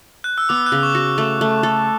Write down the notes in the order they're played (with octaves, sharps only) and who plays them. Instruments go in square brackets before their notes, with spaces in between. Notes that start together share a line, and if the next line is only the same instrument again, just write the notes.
[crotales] F#6
E6
[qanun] B3 [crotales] D6
[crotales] F#6
[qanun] C#3
[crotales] C#6
[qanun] F#4
A3
A3
A4